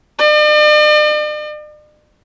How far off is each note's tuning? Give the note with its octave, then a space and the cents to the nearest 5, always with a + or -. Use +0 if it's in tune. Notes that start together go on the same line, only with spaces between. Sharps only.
D5 +45